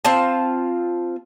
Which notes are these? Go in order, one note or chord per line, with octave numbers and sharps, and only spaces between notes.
C4 F4 A5